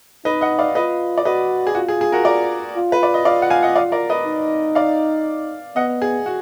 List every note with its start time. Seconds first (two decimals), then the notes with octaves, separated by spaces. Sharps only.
0.25 D#4 B4 D#5
0.41 D#5 F#5
0.59 D5 F5
0.75 F4 B4 D#5
1.18 D5
1.25 F#4 B4 D#5
1.67 G#4
1.75 F4 F#4
1.88 G#4
2.01 G#4
2.12 F#4 A#4
2.25 A#4 D5
2.76 F4
2.92 B4
3.03 D5
3.14 D#5
3.25 F4 D5 F5
3.42 F#5
3.50 F5 G#5
3.63 D#5 F#5
3.76 D5 F5
3.92 A#4 D5
4.10 B4 D#5
4.25 D#4
4.75 D5 F5
5.76 B3 D#5 F#5
6.02 G#4
6.26 F#4